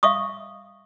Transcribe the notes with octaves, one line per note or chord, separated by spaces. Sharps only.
E5 F5 C#6 D#6